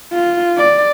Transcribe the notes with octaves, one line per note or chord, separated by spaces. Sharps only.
F4
D5